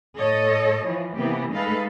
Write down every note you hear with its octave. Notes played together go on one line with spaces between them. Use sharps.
A2 A4 C#5 D#5
E3 F3
C3 E3 A#3 B3 G4
G#3 A3 D#4 A4 B4 F5